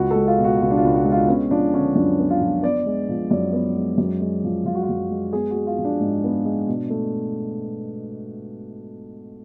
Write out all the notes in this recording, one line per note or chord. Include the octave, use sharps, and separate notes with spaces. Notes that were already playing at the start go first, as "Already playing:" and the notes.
Already playing: C#2 F#4
G#3 A4
F4
B2
F#4
C#2 F4
D4
F4
C#2
F#4
G#3
F4
B3 C#4
F3 D4
D3 C#4
F#2 D4
B3
F4
F3
B3 D5
G#3
F3
F#2 D5
B3
G#3
F#2
G#3
F3
F#2 F4
F#4
F4
F#2
G#3
B3 G#4
F#4
G#3
F4
F3
D4
G#2
B3
G#3
B2
A3